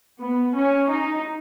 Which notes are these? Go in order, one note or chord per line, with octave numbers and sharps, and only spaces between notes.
B3
C#4
D#4